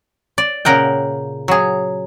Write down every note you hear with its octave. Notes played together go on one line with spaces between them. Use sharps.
D5
A#2 C#3 A#4 F#5 G5
F#3 G#4